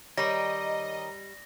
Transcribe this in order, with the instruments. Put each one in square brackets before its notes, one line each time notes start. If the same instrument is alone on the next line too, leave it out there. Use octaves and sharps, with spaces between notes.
[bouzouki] D#3 A#4 C#5 [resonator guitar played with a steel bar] G3 [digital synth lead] D#5 [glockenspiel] A#6